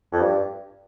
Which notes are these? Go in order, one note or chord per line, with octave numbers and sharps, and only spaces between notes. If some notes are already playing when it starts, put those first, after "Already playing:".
F2
G2